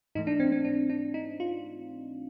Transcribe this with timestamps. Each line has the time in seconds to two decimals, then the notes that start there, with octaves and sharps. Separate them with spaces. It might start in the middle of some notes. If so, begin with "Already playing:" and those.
0.15 G#2 E3 A3 D#4
0.27 D4
0.40 C4
0.52 C4
0.65 D4
0.90 D4
1.14 D#4
1.40 F4